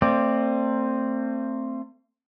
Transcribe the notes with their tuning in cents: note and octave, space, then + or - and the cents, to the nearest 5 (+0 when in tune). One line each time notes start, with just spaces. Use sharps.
A3 +40 C4 +5 D5 +0